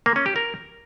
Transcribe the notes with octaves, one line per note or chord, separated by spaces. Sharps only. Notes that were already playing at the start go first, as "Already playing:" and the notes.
A#3
C#4
G4
A#4